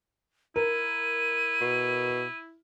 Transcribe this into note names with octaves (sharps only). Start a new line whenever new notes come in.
E4 A#4 D#7
B2